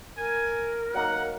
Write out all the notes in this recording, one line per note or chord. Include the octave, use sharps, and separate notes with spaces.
A#4 G#5
F#3 A#3 D#4 F#5